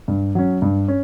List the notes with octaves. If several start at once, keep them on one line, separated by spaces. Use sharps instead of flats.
G2
F#3 C#4
G2
C#4